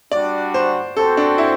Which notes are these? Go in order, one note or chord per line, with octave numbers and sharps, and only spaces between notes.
G3 D4 F#4 D5
C5
C4 F#4 A4 C5
D4
E4